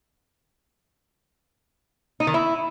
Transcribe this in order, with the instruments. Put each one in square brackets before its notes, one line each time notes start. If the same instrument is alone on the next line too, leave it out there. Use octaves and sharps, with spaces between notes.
[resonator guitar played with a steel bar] D#4
D#3
E4